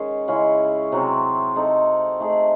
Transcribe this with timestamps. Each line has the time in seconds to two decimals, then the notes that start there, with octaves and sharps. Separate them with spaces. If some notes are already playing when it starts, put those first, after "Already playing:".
Already playing: D#3 G#3 C#4 G#4
0.28 C#3 G#3 C#4 E4
0.92 C3 F#3 C4
1.56 C4 D#4 A4
2.20 A3 D#4 G#4